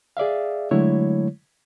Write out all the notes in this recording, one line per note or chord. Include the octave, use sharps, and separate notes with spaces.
G#4 D5 E5 F5
D3 F#3 G#3 A3 E4 C#5